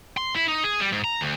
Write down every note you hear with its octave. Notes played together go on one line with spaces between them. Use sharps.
C6
E4
D#4
G#4
G3
G#2
A#5
D2